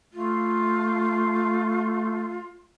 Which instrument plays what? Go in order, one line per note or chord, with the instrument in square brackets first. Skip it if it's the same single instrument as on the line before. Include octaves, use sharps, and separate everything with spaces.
[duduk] A3 [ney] F4